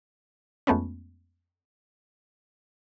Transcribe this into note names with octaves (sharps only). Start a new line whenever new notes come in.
F2 G#3 A3 B3 C#4